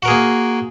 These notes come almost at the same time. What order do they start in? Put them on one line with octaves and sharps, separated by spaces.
F#4 A#4 G#4 A#3